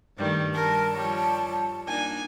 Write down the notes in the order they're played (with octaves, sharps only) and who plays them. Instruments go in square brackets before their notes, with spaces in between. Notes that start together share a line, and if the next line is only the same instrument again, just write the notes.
[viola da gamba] G2 D#3 A3 [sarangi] G3
[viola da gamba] G3 [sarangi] A#4 [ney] A5
[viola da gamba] F3 C#5 [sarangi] G3
[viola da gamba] A#3 D4 D#4 [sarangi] G#5